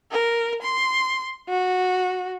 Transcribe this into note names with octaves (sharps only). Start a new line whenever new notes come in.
A#4
C6
F#4